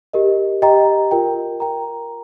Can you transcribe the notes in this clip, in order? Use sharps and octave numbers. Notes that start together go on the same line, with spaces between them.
G4 A#4 D#5
G4 D#5 G5 A#5
F4 A#4 G5
A#4 G5 A#5